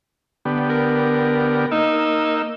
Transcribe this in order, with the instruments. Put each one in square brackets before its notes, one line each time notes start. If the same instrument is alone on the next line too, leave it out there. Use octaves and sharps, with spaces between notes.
[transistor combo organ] D3 B3 G4
[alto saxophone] A#4
[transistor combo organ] A#3 E6 [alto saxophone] D#4